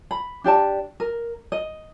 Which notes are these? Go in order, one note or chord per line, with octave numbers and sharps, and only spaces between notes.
B5
D4 G4 D5 A5
A#4
D#5